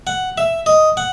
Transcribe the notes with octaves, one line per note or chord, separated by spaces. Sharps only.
F#5
E5
D#5
F#5